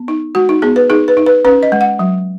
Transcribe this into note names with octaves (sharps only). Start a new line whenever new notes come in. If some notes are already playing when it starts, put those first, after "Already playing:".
Already playing: B3
D#4
G#3 F#4
D#4
B3 G#4
B4
D#4 G#4
B4
D#4
B4
C#4 B4
D#5
G#3
F#5
F#3